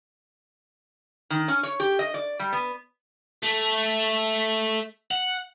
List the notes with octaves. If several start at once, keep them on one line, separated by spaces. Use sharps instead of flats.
D#3
C#4
C#5
G4
D#5
D5
G3
B3
A3
F#5